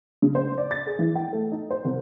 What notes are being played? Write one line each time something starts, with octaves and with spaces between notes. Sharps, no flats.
C#3
C5
D5
A6
G#4
E3
G5
A3
D#4
C5
C2